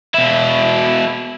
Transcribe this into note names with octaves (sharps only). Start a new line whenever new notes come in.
B2 E4